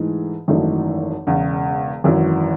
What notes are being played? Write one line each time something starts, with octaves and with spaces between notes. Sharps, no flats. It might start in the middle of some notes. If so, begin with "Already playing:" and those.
Already playing: G#2 E3 A3 D#4 G#4
G#1 F#2 E3 A3 D#4
E1 E2 C#3
G#1 F#2 E3